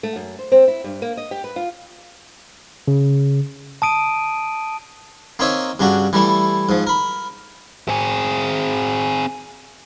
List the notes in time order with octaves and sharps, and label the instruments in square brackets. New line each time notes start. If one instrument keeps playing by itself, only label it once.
[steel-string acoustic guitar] A3
F#2
C5
C4
E4
G2
A#3
D#5
G4
B4
F4
[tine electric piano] C#3
[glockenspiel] A5 D#6 D7 D#7
[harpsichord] A#3 C4 D#4 C#5 E5
G2 C#3 D4 F#4
E3 G3 A3 E4
G#2 F3
A#4 B5
[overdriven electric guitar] C4 G#4